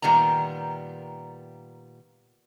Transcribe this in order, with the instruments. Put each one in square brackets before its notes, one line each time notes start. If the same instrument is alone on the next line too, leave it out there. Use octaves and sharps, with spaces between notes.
[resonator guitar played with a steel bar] A#2 D#3 G3 B3 A#5